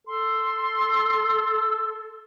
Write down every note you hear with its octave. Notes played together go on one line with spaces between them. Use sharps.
A4 C6